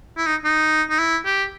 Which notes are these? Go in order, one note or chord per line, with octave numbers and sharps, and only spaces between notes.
E4
D#4
D#4
D#4
E4
G4